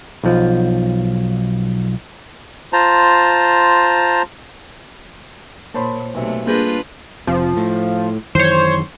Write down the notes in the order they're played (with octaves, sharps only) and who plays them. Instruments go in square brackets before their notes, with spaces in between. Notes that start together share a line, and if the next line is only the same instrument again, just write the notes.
[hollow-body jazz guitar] B1 F3
[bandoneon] F4 C5 A5 A#5
[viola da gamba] A#2 [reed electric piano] A#3 C5 C#5 [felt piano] A5 B5 C6
[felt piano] B1 B4 E5 [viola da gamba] C3 A3
[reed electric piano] G3 [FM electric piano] A#3 G#4 [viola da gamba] D4 F4 B4 [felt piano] G6 A#6
[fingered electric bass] F1 C3 [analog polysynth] F3
[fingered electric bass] A2
[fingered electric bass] F#2 D#3 E3 [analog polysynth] C5 C#5